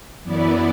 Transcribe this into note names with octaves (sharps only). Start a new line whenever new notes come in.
F#2 E3 B3 E4 D5